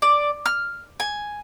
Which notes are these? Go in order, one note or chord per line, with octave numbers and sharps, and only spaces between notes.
D5
F6
G#5